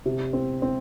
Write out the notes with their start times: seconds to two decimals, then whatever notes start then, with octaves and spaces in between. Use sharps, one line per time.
0.06 C3
0.33 C4
0.62 C4